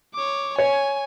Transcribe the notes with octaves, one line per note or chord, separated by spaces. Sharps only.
C#5 D6
C#5 G#5